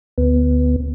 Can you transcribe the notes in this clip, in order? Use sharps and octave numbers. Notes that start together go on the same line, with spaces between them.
D2 B3